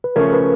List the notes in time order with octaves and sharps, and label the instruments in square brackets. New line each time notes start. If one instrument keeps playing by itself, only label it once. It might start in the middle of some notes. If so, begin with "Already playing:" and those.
[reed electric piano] B4
[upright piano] C#3 F3 A3 C#4 [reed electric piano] A#4
[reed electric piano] B4